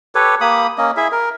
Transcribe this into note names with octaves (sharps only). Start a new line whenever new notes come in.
G4 A4 B4 C#5
A#3 G4 B5 D#6
A#3 C#4 D#5
E4 G#4 E5
A#4